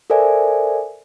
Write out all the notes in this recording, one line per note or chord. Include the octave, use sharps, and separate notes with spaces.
A4 A#4 C5 D5 E5 G#5